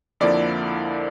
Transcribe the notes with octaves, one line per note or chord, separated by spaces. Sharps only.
F2 D3 F3 A#3 E4 D5